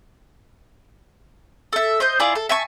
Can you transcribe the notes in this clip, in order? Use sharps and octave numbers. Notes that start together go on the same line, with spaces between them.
A4 E5
C5 D#5 G6
E4 F4 G#4 D5
A4
E5 G#5 A5 C#6